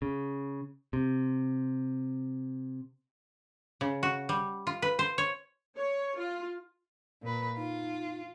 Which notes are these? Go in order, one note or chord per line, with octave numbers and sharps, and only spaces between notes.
C#3
C3
C#3
F#4
G3
F4
B4
C5
C#5
C#5
F4
A#2 B4
D#4 F4